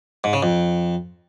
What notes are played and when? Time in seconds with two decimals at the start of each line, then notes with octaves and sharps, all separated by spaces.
0.24 G#2
0.33 C#3
0.43 F2